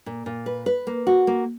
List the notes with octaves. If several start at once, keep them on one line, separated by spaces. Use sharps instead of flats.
A#2
A#2
B4
B4
A#3
F#4
A#3